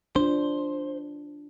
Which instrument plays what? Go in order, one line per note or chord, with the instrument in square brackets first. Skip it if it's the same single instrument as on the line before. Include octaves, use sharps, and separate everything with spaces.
[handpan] D4 F4 [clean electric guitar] C5